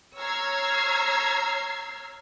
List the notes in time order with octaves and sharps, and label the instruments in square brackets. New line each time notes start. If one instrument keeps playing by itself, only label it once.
[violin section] C#5 A#5 E6 F6 G#6 C7